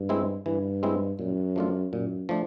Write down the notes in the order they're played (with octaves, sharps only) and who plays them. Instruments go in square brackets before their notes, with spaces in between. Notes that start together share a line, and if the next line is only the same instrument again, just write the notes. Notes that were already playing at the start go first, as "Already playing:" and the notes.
Already playing: [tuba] G2
[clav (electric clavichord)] G#3 C4 E4
[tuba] G2 [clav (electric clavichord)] E3
[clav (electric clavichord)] G#3 C4 E4
[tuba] F#2 [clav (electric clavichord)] A#2
[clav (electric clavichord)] F3 A3 D4 F4
[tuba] F#2 [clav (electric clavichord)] A#2
[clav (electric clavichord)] F3 A3 D4